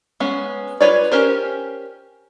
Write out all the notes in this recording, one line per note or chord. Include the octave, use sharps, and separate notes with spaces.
G#3 B3 C#4
F4 B4 C#5 D5
C#4 G4 A#4 C5